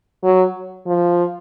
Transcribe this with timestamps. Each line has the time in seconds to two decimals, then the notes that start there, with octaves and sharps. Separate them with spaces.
0.24 F#3
0.87 F3